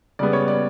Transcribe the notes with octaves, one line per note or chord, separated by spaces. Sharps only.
C#3 G3 B3 D5
C#5
D5